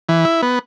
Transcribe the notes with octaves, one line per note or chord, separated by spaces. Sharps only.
E3
E4
B3